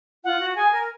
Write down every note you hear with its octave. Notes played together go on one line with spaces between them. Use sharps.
F4 F#5
F#4
G#4 G#5
A#4